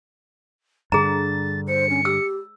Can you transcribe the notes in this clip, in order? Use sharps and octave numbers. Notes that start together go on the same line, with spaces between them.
G2 D3 G#4 A#5 A6
C5 C#7
C#4
G4 E6